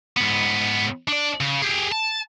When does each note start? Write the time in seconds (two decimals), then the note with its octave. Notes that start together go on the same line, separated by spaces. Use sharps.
0.17 G#2 B3
1.08 D4 D5
1.41 C#3
1.62 G4 G#4
1.92 A5